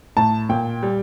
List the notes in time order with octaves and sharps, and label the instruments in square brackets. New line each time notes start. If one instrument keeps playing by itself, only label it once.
[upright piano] A2 A5
A#2 G5
G3